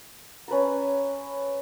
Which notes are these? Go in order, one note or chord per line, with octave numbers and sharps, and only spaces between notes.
C#4 B4 A5 A#5